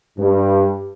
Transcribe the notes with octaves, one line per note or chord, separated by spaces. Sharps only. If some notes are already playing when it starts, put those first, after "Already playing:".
G2